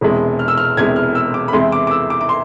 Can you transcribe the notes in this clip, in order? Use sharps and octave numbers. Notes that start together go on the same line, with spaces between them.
E1 E2 C3 G#3
F6
E6
F6
E1 E2 C3 G#3 G#6
F6
E6
D6
B5
E2 C3 E3 G#3 C6
D6
D6
E6
D6
D6
C6